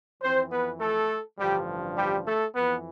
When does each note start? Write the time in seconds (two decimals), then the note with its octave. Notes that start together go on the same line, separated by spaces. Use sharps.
0.23 F2 E3 C4 C5
0.51 B3 B4
0.80 A3 A4
1.39 A1 G2 D3 F3 G3 G4
1.97 G3 G4
2.26 A3 A4
2.55 F2 E3 B3 B4